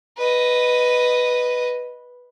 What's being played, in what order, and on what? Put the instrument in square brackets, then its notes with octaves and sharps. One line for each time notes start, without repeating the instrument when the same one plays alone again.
[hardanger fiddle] B4 D#5